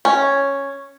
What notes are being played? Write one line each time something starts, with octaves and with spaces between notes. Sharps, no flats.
C#4